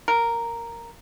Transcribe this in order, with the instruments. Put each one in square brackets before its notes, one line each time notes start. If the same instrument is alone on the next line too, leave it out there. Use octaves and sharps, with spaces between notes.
[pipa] A#4